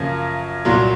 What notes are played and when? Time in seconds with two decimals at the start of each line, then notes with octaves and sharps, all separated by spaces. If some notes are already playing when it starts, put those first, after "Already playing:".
Already playing: F#2 C#3 F3 A#3 C#4
0.65 C2 A#2 F#3